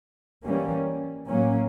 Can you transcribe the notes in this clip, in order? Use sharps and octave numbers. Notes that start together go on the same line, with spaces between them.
E3 G3 A#3 C#4
A2 F#3 A#3 C#4